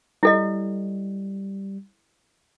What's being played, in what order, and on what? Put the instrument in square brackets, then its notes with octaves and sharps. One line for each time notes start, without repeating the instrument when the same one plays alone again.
[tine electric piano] G3 [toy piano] E4 A4 D#5